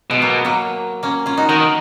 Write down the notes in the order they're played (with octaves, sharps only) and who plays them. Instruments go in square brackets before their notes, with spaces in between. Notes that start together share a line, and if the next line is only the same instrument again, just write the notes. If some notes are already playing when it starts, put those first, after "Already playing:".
[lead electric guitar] B2 [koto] G#3
[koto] F#3 A#3
F#3 A#3
A#3 C#4
C#4 F4
D#4 F#4
[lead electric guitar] D#3 [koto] F#4 A#4